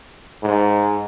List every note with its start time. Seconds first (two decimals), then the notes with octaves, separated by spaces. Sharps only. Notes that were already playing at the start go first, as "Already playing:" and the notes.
0.43 G#2